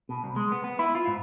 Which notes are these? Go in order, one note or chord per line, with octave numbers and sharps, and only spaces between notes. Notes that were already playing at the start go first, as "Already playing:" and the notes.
B2
C2
G#3
B3
B3
E4
F4
G#2